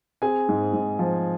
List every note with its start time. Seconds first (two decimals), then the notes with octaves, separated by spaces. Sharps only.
0.22 C4 G#4 G#5
0.49 G#2
0.73 G#2
0.99 F3